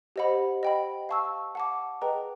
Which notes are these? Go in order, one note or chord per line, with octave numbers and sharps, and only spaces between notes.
G4 C5 D#5 F#5 B5
D#5 G5 B5
F5 A5 C#6 E6
F#5 A5 D6
G#4 B4 D#5 G5 A#5